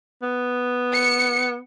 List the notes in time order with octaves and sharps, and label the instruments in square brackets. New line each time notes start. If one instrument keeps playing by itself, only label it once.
[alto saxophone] B3
[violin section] C#7